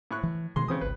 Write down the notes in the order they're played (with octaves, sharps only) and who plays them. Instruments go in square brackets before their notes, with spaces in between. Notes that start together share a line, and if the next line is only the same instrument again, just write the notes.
[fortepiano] A2 C#6 F#6
[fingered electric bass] E3
[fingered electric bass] B2 D#3 [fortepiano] G#3 C6
[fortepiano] C#3 C5 D#6 [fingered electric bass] E3 C4
[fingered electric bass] G#1 C#2 [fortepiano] B4